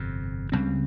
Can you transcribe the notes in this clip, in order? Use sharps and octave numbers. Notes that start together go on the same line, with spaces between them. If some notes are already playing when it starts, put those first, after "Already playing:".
Already playing: G1 F2 C3
C#2 C#3 G3 C4